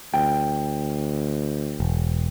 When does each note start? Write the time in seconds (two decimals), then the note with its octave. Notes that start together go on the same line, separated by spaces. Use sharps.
0.14 D2 G5
1.80 E1